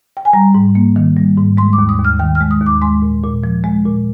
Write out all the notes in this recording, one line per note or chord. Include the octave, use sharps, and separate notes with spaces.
G5
G#5
G3 A#5
G#2
A#3
D#3
G3
G#2
G#3 C6
D6
D#2
D#6
D#2
F6
D#3 G5
F6
G#3
D#6
D#2
D6
G#3 C6
A#2
A#2
F3
G#3
A#2